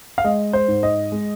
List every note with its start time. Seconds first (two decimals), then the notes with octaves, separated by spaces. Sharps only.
0.18 F5
0.24 G#3 D#5
0.53 C5
0.68 G#2
0.83 D#5
1.12 G#3